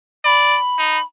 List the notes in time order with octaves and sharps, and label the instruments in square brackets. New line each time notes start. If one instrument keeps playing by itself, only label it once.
[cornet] D5 [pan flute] B5
[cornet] D#4